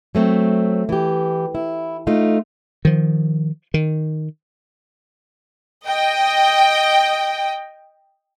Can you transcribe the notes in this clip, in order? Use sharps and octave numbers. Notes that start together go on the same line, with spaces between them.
F#3 A3 C4
E3 G4
E4
A3 D#4 F4
D#3 F3
D#3
D#5 G5